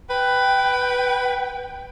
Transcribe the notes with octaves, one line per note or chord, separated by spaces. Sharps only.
B4 G5